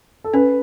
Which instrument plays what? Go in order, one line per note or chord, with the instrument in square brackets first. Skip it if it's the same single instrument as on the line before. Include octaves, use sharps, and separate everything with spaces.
[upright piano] A4
[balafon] C#4 [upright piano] B4